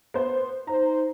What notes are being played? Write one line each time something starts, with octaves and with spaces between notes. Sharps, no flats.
B3 C5
D#4 C5 A#5